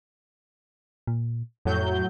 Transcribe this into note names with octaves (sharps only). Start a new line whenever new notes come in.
A#2
F2 A2 F#3 G6